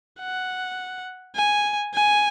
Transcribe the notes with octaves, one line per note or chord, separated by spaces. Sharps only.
F#5
G#5
G#5